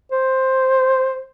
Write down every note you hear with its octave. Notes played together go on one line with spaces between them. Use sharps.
C5